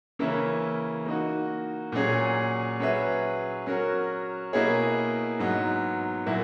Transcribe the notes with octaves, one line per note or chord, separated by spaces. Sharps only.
C#3 E3 A#3 C#4 E4
A#3 D#4 F#4
A#2 F#3 C#4 G#4
F#3 C#4 G#4 B4 E5
F#3 C#4 F#4 A#4
B2 A#3 E4 G#4 C#5
G#2 F#3 B3 D#4
A#2 F#3 A#3 E4